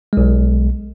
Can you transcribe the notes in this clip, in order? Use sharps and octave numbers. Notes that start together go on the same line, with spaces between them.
B1 G#3